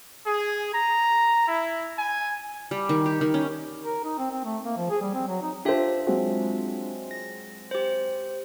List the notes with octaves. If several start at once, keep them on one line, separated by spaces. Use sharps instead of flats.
G#4
A#5
E4
G#5
G3
D#3
G4
D#3
C#4
A#4
D#4
C4
C4
A3
A#3
F3
G#4
G3
C4
F#3
D#4
D4 F4 G4 C5 E5
F#3 G#3 C4
A#6
G4 C5